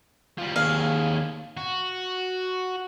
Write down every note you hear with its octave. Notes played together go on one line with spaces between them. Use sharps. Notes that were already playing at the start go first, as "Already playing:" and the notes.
F3 G3
D#2 G#4 F5
F#4